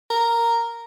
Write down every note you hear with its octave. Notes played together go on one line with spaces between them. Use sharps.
A#4